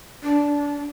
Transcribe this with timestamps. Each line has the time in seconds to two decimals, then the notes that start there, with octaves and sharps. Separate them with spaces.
0.23 D4